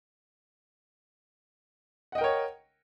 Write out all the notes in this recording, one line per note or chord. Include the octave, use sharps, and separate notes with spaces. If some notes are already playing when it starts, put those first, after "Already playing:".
A#4 C#5 D#5 F#5 G5